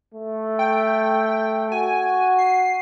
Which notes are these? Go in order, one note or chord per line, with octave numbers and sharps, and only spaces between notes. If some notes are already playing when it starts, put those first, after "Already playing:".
A3
G5
F#4 G#5
C7